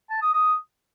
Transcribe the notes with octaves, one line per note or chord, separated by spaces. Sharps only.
A5
D#6
D#6